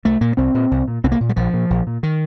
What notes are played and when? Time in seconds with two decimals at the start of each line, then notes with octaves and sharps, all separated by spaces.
0.05 C2 A3
0.21 A#2 A#3
0.37 C2 C4
0.55 A#2
0.71 C2
0.88 A#2
1.04 C2 C4
1.12 A#3
1.20 A#2
1.29 G3
1.36 A#1 F3
1.54 A#2
1.70 A#1
1.87 A#2
2.03 D#3